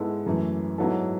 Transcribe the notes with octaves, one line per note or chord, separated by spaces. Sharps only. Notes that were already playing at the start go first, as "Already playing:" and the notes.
Already playing: G#2 G#3 B3 E4 A4
F#2 E3 A3
G#2 F#3 B3 E4 A4